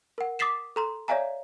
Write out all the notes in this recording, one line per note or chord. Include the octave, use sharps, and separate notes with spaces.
A#4 F#5
D6 D#6 A6 B6 C7 E7
A4 A#5 C6
C#5 D5 E5 F5 G#5 A#5